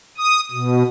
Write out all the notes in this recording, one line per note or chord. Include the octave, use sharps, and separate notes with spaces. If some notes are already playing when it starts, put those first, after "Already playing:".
D#6
B2